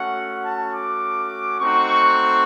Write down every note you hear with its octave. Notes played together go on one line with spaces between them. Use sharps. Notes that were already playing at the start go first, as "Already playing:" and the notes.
Already playing: A3 C#4 F#4 F#5
A5
D6
A3 C4 D#4 F#4 C#6